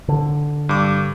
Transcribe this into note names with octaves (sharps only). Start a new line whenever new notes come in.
D3
G2 D6